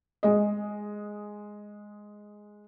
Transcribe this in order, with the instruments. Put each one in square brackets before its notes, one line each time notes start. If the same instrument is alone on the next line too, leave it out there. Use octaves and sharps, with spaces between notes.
[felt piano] G#3 D#5